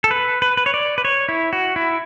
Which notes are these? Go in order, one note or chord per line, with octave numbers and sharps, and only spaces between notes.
A4
B4
B4
B4
C#5
D5
B4
C#5
E4
F#4
E4